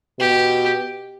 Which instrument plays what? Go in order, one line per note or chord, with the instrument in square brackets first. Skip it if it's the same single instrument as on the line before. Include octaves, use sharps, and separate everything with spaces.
[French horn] B2 [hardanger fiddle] G4